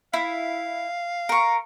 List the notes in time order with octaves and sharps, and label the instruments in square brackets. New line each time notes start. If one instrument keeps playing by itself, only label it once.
[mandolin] E4 [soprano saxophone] F5
[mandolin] A#4 C#6